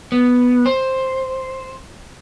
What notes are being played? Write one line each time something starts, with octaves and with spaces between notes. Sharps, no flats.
B3
C5